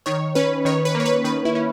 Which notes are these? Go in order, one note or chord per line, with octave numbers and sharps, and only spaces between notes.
D#3 C#5
C#4 B4
D#3 C#5
B4
A#3
C#5
B4
D#3 B4
E4
C#4